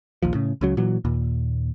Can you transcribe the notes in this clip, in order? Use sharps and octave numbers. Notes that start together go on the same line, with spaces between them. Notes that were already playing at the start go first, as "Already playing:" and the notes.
A#1 D#2 F3
A2 C#3
C#2 C#3 F#3
A#2 E3 F#3
D#2 A#2